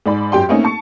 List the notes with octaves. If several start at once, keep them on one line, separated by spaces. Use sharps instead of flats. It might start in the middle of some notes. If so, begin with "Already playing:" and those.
G#2 D5 B5
F#2 G4 G5 C6
A3 A#3 C4 C#4 D#4
A5 C#6 C#7